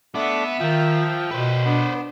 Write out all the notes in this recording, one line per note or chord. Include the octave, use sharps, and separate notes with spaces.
A3 B3 D4 E5 D6
D#3 F3 G5
B2 B4 C5
B3 D4